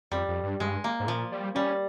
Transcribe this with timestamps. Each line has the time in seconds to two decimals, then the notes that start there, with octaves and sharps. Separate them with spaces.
0.12 F2 G3
0.28 F2
0.43 G2
0.60 G2 G#3
0.84 A#3
1.00 G#2
1.07 A#2 F3
1.32 G3
1.55 G3 C#4